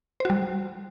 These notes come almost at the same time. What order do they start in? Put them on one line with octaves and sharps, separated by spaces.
C5 F#4 G3